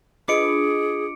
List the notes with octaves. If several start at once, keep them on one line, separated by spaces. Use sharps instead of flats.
D4 F4 G#4 D#5 D6 C#7 D7